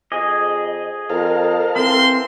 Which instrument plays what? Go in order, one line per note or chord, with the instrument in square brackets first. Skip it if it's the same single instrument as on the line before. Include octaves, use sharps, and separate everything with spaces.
[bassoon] F2 [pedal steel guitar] G#4 D#5
[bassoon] F2 [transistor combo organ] A4 A#4 F5
[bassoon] E3 [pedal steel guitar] C4 [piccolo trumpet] C6